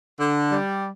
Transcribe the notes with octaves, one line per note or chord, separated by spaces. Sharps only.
D3
G3